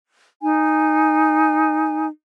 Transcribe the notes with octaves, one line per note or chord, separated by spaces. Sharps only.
D#4 G#5